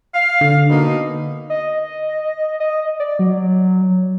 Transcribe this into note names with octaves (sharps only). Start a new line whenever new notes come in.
F5
D3
B2 A#3 D#4
D#5
D#5
D5
F#3